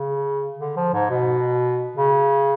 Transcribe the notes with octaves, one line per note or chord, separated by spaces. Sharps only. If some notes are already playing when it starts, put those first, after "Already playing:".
Already playing: C#3
D3
F3
G#2
B2
C#3